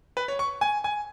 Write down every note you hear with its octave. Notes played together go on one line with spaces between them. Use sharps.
B4
C#5
C#6
G#5
G#5